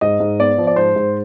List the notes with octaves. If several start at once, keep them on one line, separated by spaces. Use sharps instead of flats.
G#2 D#5
G#2
B3 D5
F3
D5
G#2 C5
G#2